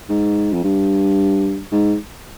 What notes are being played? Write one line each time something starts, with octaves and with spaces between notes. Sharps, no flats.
G#2
F2
G2
G#2